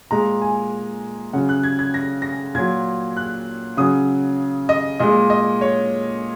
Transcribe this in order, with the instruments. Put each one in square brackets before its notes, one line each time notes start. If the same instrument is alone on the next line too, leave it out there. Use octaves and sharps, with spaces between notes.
[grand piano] A#2 G#3 A#5
G#5
C#3 F#3 F#5
F#6
G#6
G#6
A#6
A#6
A#2 F#3 G#6
F#6
C#3 F#3 D#6
D#5
A#2 G#3 D#5
D#5
C#5